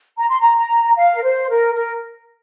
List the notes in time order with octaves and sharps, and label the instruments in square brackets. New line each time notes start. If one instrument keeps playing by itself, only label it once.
[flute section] A#5
C6
A#5
A#5
F5
A#4
C5
A#4
A#4